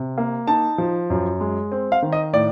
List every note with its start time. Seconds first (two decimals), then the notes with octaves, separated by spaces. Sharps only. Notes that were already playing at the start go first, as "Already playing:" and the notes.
Already playing: C3
0.18 A#3
0.47 D#4 A5
0.78 F3
1.10 F#2
1.40 G#3
1.72 C4
1.92 F5
2.02 D#3
2.13 D#5
2.33 A2 D5